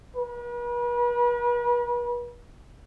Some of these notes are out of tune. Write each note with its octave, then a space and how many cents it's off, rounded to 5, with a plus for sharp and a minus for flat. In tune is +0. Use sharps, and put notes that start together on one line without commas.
B4 -40